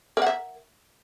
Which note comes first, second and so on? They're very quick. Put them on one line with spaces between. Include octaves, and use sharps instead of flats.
A#4 F#5 E5